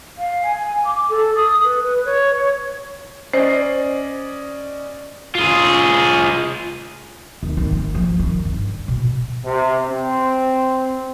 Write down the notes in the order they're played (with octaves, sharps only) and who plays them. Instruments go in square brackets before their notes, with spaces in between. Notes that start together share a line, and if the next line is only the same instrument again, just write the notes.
[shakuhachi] F5
G#5
D6
A4
D#6
B4
B4
C#5
[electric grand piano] C#4 D5 D#5 [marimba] C5
[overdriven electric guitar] F4 G#4
[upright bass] D#2
D#3
A#3
F3
D#3
G2
B2
[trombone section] C3
C4